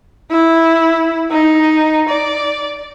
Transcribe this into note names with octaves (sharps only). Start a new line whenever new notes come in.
E4
D#4
D5